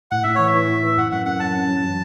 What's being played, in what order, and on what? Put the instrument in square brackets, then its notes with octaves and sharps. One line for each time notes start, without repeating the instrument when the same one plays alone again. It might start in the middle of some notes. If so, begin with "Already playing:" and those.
[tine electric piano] A2 [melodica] F#5
[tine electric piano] A2 [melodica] E5
[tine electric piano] E3 [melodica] C#5
[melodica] E5
[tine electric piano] E3
A2
E3
[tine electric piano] F#2 [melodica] F#5
[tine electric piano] F#2 [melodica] F#5
[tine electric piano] F#2 [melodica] F#5
[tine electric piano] F#2 [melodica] A5
[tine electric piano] C#4
F#3
F#3